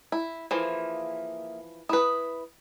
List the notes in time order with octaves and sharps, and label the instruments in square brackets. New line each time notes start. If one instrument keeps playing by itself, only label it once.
[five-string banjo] E4
[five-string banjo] E3 F3 [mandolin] A#3 E4 G#4
[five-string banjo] E4 B4 [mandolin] D#6